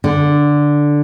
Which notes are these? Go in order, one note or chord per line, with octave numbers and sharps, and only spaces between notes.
D3